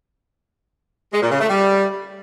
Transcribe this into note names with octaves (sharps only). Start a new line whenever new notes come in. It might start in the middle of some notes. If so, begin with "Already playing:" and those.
G#3
A#2
C#3
A3
G3